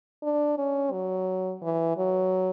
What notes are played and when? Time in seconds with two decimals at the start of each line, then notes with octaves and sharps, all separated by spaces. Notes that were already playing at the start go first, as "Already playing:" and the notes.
0.23 D4
0.58 C#4
0.92 F#3
1.62 E3
1.97 F#3